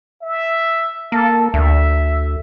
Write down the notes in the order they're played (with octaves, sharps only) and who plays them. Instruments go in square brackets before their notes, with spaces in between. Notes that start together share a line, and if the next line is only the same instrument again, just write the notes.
[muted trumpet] E5
[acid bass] A#3 [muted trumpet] A4
[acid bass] D2 [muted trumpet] E5